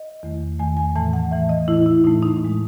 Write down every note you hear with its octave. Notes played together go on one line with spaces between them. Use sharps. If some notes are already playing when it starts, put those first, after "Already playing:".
Already playing: D#5
E2 D#3 A3
E2 D#3 A3 G#5
G#5
A2 E3 A3 A5
F#5
A2 E3 A3 E5
D#5
A2 E3 A3 E4
E4
A2 E3 A3 D#4
D#4
A2 G#3